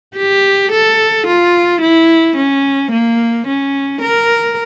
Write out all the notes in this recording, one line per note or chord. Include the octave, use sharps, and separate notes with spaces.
G4
A4
F4
E4
C#4
A#3
C#4
A#4